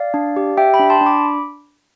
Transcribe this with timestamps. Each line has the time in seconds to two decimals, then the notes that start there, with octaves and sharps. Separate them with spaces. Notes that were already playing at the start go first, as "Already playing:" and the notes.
Already playing: D5 F5
0.14 D4
0.36 G4
0.57 G4 E5 G5
0.74 G5 B5
0.79 D4
0.90 A5 C6
1.01 D4
1.06 B5 D6